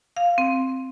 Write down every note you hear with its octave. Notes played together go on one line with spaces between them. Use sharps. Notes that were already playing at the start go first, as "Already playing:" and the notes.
F5
C4